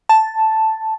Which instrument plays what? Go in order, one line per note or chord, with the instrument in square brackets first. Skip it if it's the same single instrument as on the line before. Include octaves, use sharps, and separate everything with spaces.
[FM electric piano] A5